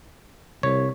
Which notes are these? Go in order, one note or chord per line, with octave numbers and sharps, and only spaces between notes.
C2 C3 C#5